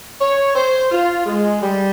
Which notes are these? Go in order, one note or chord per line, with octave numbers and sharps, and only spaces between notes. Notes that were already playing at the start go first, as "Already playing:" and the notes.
C#5
C5
F4
G#3
G3